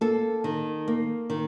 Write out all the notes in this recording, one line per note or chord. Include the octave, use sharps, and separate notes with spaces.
A#3 A4
D#3
A#3
D#3